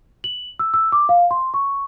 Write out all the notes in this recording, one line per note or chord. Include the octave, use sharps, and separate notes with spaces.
F#7
E6
E6
D6
F5
C6
C#6